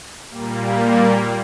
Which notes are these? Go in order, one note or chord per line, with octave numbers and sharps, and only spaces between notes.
A#2 G3 A#3